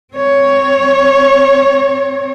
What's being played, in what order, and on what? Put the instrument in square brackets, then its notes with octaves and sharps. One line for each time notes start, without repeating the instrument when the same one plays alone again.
[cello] C4 C#5